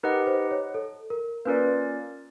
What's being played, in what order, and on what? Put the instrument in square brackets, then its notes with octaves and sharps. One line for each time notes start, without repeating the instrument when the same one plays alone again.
[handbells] D#4 G4 B4 D#5 F#5 [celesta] A#4
[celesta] C5
C#5
A4
A#4
[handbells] A#3 C#4 F4 A#4 D5 [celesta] B4